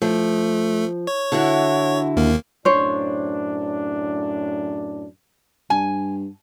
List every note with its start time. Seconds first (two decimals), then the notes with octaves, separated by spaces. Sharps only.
0.02 F3 A3
1.07 C#5
1.32 D3 E4 F#4
2.17 D#2 A#3
2.65 F#2 A2 D4 C5 C#5
5.70 G2 G#5